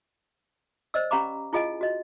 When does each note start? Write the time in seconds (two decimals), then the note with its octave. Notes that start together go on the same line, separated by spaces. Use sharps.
0.94 C5 D5 D#5 E6
1.11 C#4 G4 F5 A#5 B5 D6
1.53 E4 F4 G#4 D#5 F5 G#5
1.81 F#4 D#5